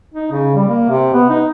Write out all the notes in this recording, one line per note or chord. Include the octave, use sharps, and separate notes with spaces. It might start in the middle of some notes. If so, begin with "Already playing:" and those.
D#4
C#3
G3
A#3
C3
B3
D#4